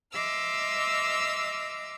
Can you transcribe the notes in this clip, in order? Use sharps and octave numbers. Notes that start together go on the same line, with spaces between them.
D#5 E5 C6 D6 E6 F6